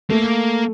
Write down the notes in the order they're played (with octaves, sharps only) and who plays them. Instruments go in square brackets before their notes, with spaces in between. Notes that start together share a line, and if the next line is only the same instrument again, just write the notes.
[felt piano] A3 [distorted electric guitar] A#3